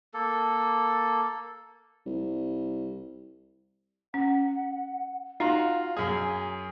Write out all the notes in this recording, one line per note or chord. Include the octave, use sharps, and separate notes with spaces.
A#3 A4
C2
C#4 F#5
D#4 F4 F#4 F5 A#5
F#2 G#4 G#5